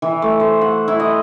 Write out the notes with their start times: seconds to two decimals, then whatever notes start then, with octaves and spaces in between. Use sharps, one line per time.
0.02 E3
0.22 A3
0.40 C5
0.61 F#5
0.88 E4
1.00 D#5